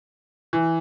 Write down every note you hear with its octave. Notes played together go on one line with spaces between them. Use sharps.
E3